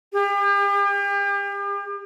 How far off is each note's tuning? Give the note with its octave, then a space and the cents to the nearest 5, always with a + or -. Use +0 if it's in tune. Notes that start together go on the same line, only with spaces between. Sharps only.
G4 +40